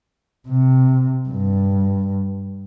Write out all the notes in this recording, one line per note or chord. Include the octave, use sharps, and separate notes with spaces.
C3
G2